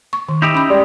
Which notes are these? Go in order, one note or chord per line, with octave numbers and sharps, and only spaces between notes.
C#6
D#3
D#4 E4 G4
C#4 B5
G3 G#3